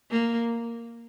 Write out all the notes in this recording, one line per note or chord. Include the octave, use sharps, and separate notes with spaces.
A#3